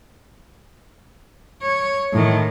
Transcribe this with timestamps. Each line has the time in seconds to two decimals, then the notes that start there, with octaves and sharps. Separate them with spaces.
1.62 C#5
2.13 A2 D#3